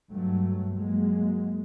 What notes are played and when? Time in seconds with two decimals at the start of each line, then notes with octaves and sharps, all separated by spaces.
0.11 G2 F#3 A3
0.76 F#3 G#3 A#3